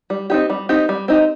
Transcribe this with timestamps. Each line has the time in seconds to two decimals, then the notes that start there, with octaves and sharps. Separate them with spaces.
0.10 G3
0.30 C4 D#4 G4
0.50 G3
0.69 C4 D#4 G4
0.89 G3
1.08 C4 D#4 G4